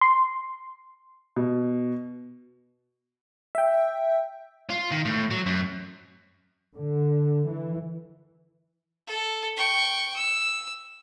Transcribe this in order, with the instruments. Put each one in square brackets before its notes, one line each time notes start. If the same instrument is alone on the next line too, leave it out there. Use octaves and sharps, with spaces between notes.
[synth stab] C6
[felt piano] B2
[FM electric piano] E5 G5
[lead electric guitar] F4
D#3
A2
F#3
F#2
[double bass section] D3
E3
[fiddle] A4
G5 C#6
E6